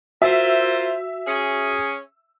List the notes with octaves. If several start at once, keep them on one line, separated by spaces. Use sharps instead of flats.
F4 F#4 A#4 C5 E5 E6
C#4 G#4